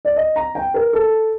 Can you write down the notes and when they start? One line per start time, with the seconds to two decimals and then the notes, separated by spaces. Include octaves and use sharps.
0.05 D5
0.16 D#5
0.36 A#5
0.55 G5
0.74 A#4
0.93 A4